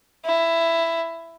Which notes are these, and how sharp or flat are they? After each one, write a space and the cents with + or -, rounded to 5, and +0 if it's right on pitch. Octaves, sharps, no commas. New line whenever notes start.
E4 +10